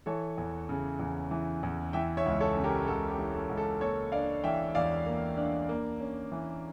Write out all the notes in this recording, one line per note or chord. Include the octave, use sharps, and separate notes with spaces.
E3 A4 C#5
E2
C#3
E2
E3
E2
E3 E5 G5
C#5 E5
C#2
A4 C#5
C#3
G4 A#4
C#2 A4
G4
E3
A4
C#2
A4
A#3 A4 C#5
D4 D5 F5
E3 E5 G5
E2 D5 F5
A#3
D4
A#3
C#4
E3